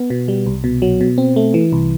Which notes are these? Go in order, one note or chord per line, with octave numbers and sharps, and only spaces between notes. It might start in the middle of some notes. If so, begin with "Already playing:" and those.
Already playing: B3
B2
G3
C2
B2
F#3
B2
C4
A3
E3
C2